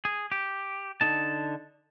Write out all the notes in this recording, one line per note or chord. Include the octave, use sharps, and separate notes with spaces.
G#4
G4
D3 D#4 A5